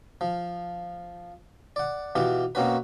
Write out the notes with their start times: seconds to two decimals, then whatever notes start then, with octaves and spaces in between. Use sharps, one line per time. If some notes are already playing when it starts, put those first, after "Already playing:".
0.21 F3
1.76 D5 F#5
2.15 B2 E3 F4 G4
2.55 B2 A#3 C4 C#4 F#4 B4